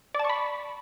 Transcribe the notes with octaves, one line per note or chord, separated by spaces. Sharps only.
D5 A5 B5 C#6